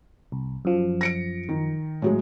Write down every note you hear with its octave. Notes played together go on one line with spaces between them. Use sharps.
C2
F#2 F3
A#6 C#7 D7
D#3
A2 F#3 G#3